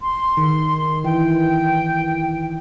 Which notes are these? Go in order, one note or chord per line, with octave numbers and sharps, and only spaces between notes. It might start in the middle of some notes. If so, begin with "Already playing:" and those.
C6
D#3
E3 G5